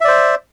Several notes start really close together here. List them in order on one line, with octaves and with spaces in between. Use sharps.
E5 D5 C5